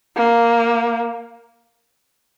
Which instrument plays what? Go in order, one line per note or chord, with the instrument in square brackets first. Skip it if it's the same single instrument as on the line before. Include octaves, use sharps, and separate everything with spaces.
[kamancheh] A#3